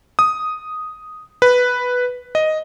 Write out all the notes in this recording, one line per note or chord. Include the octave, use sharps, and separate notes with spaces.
D#6
B4
D#5